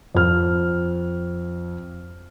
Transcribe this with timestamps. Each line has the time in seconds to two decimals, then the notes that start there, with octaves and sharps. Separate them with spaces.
0.15 F2 F6